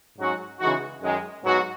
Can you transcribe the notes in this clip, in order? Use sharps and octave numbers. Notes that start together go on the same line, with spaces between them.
G#2 F#3 C#4 F#4
C#3 E3 G#3 D#4 F#4
F#2 D#3 G#3
G#2 F#3 B3 F#4